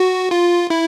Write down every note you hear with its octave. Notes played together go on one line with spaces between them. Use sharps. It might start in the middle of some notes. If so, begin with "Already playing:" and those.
Already playing: F#4
F4
E4